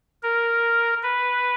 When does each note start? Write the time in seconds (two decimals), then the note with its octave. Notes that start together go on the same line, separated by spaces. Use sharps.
0.23 A#4
1.03 B4